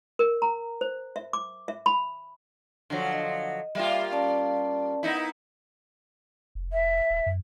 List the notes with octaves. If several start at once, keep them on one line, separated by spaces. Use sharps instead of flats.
A#4
A#5
C5
E5
D6
E5
B5
D3 F3 F#3
D#5
G3 A#3 F4 E5
C#4 D5 A5
B3 D#4 E4
F1
E5
D#1
F#2